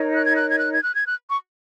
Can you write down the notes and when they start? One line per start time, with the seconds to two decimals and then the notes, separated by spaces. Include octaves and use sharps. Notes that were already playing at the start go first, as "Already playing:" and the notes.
Already playing: D#4 A#4 C#5
0.13 F#6
0.25 G#6
0.36 F#6
0.48 G#6
0.59 F#6
0.72 G#6
0.83 F#6
0.95 G#6
1.07 F#6
1.30 C#6